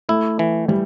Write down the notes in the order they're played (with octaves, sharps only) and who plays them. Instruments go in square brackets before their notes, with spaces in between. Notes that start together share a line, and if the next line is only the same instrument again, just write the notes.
[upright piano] A3 [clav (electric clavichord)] E4
[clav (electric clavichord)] E3
[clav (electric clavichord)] E3 [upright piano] G3